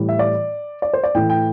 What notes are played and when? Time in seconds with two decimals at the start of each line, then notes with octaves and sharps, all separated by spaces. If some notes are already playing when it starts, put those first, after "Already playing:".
Already playing: A2 E3 G3
0.09 E5
0.19 D5
0.82 D5
0.94 C5
1.04 D5
1.14 A2 E3 A3 G5
1.30 G5